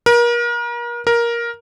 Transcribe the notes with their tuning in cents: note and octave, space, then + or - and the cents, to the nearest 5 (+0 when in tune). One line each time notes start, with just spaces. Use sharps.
A#4 +35
A#4 +10